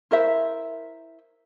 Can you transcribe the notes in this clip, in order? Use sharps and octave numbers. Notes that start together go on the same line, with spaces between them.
E4 A#4 C5 E5